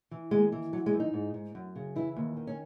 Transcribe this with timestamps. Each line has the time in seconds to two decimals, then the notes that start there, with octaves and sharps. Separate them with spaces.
0.11 E3
0.31 D#2 G#3
0.52 E3
0.72 F#2 F#3
0.86 G#3
0.93 F#2
1.00 D#4
1.13 G#2
1.34 G#2
1.55 F#2
1.76 C#3
1.96 E3 E4
2.16 D#2
2.37 D#3
2.47 C#4